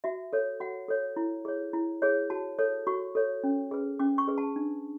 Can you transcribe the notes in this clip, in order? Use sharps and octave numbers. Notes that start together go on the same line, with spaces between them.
F#4 E5
A4 C#5
F#4 F#5
A4 C#5
E4
G#4 C#5
E4
G#4 C#5
F#4 A5
A4 C#5
F#4 C#6
A4 C#5
C#4
G#4 B4
C#4 D6
C#6
G#4 B4
A5
D4